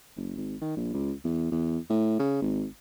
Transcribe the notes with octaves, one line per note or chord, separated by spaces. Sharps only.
F#1
G#1
D#3
A#1
C#2
E2
E2
A2
C#3
G#1